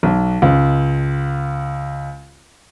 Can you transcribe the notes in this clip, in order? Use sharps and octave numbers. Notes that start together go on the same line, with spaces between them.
B1
C#2